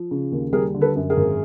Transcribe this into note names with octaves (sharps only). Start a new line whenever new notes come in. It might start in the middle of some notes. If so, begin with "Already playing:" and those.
Already playing: F3
C#3
D#2
G3 G#4 A#4
D3
A4 B4
F#2
G#4 A#4
G#1